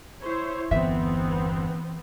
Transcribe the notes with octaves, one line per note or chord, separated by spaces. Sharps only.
E4 C5 C#5
G1 E2 E3 B3 C4 E5